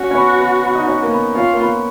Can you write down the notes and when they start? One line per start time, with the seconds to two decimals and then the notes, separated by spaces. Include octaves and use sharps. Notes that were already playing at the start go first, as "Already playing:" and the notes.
Already playing: C#4 F#4
0.11 C#4
0.14 B3
0.39 B3
0.63 B3
0.75 D#4
0.87 C#4
1.03 A#3
1.11 B3
1.35 C#4 F4
1.53 A#3
1.60 B3